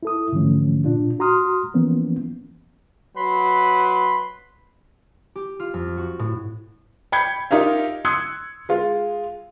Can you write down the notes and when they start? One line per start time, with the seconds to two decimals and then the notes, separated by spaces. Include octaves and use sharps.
0.03 E4 A4 D#6
0.32 G#2 D3 E3 F3 A3 C#4
0.84 A#2 D4 F4
1.19 F#4 A#5 C6 D#6 F6
1.74 E3 F3 A#3 B3 C#4
3.16 F#3 B4 B5 C6
5.36 G4
5.60 F4
5.74 F2
5.97 F#4
6.19 A2
7.12 G5 B5 G6 G#6 C#7
7.51 D#4 F4 G4 A#4 E5 F5
8.05 C6 D#6 E6 F#6 G#6 C#7
8.69 G#3 F4